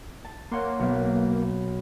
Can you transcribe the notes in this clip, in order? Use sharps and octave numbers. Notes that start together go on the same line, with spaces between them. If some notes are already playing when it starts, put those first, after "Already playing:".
A5
A#3 C#5 F#5 C6
B1 B3